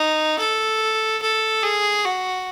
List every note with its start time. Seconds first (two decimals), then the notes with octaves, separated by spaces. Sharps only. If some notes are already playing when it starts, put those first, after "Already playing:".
Already playing: D#4
0.39 A4
1.22 A4
1.63 G#4
2.05 F#4